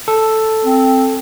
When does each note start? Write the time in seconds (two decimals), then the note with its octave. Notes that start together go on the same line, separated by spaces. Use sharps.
0.08 A4
0.65 C4